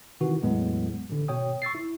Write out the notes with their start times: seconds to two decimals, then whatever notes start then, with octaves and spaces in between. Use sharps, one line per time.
0.21 C3 D#3 E3 F#4
0.42 E2 A2 F#3 G#3 B3
1.09 A1 D3
1.28 G#1 B2 C#5 G5 D#6
1.62 C#6 E6 A6 C7
1.75 E4